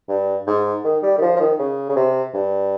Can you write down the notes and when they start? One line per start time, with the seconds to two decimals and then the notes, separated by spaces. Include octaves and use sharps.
0.09 G2
0.47 G#2
0.84 D#3
1.03 G3
1.18 D#3
1.22 F3
1.36 F3
1.40 D#3
1.59 C#3
1.89 C#3
1.96 C3
2.34 G2